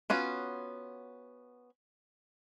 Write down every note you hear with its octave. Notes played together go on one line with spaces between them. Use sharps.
B3 C#4 F4 F#4